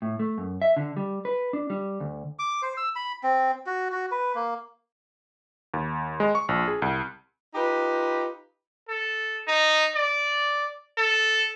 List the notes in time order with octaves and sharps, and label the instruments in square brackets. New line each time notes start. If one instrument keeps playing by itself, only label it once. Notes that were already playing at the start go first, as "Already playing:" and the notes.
[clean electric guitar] A2
A3
F#2
E5
D3
G3
B4
D4
G3
D2
[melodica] D6
C5
E6
B5
C4
F#4
F#4
B4
A#3
[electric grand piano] D#2
G#3
C#6
A#1
G#4
C2
[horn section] D#4 F4 G4 B4
[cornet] A4
D#4
D5
A4